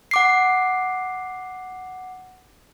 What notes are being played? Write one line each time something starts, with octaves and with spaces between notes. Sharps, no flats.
F#5 D6 C7